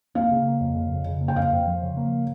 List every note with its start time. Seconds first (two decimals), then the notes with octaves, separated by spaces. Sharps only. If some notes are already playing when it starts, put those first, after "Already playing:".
0.15 A#3 F5
0.31 C#3
0.46 A#3
0.61 F2
0.76 C#3
0.91 F2
1.06 C#3
1.21 A#3
1.28 G5
1.36 F2 F5
1.52 F2
1.67 F3
1.82 C#3
1.97 A#3